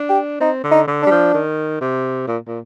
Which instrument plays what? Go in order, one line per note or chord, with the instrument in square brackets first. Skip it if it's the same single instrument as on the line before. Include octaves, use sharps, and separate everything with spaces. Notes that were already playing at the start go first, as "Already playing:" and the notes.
Already playing: [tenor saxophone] D4
[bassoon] G4
[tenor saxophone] C4 [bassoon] D#4
[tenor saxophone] D3
[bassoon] D#4
[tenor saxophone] D3
[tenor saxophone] G3 [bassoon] D4
[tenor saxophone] F3
D#3
C3
A#2
A#2